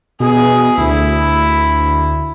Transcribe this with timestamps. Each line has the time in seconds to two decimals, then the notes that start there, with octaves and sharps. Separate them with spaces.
0.20 B2 G#4
0.78 D2 E4